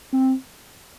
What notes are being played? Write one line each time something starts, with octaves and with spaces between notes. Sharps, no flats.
C4